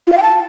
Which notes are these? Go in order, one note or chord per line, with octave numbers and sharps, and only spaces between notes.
F4
F5
G5
A5